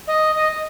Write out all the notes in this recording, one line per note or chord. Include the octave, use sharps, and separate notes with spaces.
D#5
D#5